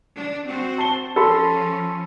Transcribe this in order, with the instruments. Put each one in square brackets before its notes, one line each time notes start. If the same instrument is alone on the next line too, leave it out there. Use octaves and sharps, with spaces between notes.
[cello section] D4
C4 F#4 C5
[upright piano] A5 G7
[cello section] F3 C#4 [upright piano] A4 B5 C6